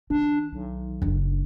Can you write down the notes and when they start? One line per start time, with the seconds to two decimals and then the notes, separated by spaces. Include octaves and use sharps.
0.10 D#3 D4
0.53 B1
1.02 F#1 D4